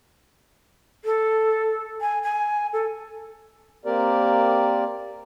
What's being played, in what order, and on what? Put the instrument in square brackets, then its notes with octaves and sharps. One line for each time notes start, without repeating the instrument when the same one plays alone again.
[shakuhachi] A4
G#5
G#5
A4
[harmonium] A#3 C4 G4 A#4 D5